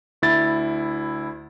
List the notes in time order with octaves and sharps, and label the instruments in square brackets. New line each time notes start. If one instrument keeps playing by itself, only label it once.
[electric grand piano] D2 E4 A6